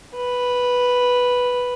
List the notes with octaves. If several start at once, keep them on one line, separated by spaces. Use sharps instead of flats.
B4